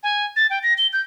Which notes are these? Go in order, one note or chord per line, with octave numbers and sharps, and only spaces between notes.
G#5
A6
G5
A#6
G7
G6